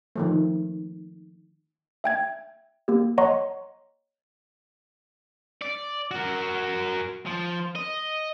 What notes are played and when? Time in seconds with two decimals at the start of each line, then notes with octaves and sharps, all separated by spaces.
0.16 D#3 F3 A3
2.04 E5 G5 G#6
2.88 A#3 G4
3.18 C#5 D#5 F#5 A#5 C6 C#6
5.61 D5
6.11 F#4 A#4
7.26 F3
7.76 D#5